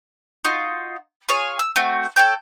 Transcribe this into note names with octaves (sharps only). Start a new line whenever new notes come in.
D#4 F4 F#4
F4 G#4 C#5 G#5
E6
A3 C4 F#4
A4 C#5 G5 G6